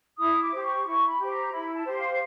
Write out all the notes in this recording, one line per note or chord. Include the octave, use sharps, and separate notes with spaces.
E4 D#6
D6
G4 C5
C#6
E4 C#6
B5
G4 C5
A#5
E4 B5
A5
G4 C5
F5